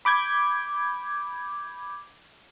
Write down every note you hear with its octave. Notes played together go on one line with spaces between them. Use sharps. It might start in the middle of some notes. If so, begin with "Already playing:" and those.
B5 D6 G6 G#6